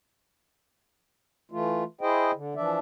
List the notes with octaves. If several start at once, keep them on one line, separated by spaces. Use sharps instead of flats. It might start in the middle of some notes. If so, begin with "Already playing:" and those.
E3 A3 F4
E4 G#4 C5 D#5 G5
D3
E3 F3 D4 D5 E5